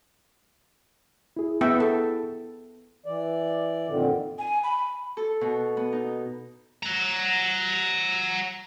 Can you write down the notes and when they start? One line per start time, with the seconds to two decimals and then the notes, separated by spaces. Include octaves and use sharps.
1.37 E4 G#4
1.61 B3 E5 G5
1.80 A4
3.06 E3 D5
3.88 F2 A#2 D3 D#3
4.39 G#5
4.64 B5
5.17 A4
5.41 B2
5.77 B3
5.93 D#4
6.83 F#5 A#5